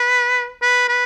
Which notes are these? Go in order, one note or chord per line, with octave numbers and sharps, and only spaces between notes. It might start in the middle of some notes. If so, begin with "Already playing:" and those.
Already playing: B4
B4
B4